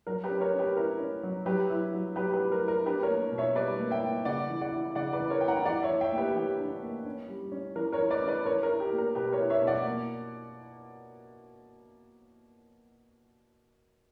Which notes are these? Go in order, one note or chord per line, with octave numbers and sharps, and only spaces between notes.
F#3 A#4
G4 B4
C#4
A#4 C#5
C#4
G4 B4
E4 A#4
C#4
F#3
F#3 G4 B4
E4
F#3
F#3 G4 B4
G4 B4
F#3
A#4
E4
A#4
D4 G4 B4
A#4 C#5
A#3
B2
C#5 E5
G3 B4 D5
A#3
E5 G5
A#3
C#3 D5 F#5
E3
D5 F#5
E4
C#3 D5 F#5
B4 D5
E3
A#4 C#5
E4 G5
F#5 A#5
E3 D5 F#5
C#5 E5
E3
E5 G5
A#3
G4 B4
E3 G4
D4
A#3
C#4
G3
C#4
E3 A#4
A#4 C#5
E3
B4 D5
C#4
B4 D5
E4 A#4 C#5
A#4
E4
G4
A#3
A#4
B2 G4 B4
A#4 C#5
E4
C#5 E5
B2
D5 F#5
A#3